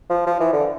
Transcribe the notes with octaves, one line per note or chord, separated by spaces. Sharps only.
F3
F3
E3
D3